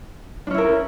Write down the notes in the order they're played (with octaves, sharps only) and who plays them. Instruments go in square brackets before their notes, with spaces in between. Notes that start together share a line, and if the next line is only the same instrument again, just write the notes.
[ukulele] D4
C#4
E4
A#4